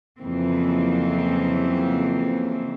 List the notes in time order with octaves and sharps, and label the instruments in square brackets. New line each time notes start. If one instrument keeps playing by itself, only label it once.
[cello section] F2 C#3 E3 F#3 A#3 C4